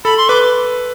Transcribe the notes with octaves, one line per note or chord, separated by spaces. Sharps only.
A4 B5
C6
B4 D6